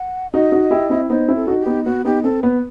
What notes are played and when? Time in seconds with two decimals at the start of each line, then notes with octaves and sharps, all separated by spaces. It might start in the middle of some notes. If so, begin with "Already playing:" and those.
Already playing: F#5
0.33 D#4 F#4 D#5
0.52 D#4 F#4
0.71 E4 G4
0.90 C4 E4
1.10 B3 D#4 C5
1.28 C4 E4
1.35 A4
1.47 D#4 F#4
1.60 G4
1.66 B3 D#4
1.85 B3 F#4
2.05 B3 D#4 G4
2.23 C4 A4
2.43 B3 B4